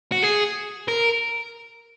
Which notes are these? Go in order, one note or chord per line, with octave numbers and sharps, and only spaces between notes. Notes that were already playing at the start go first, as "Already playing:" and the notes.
F#4
G#4
A#4